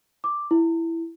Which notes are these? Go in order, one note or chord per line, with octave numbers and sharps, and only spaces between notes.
D6
E4